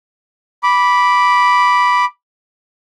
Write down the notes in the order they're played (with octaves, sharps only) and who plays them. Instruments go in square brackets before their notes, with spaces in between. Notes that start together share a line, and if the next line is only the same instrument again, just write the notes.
[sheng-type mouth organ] B5 D6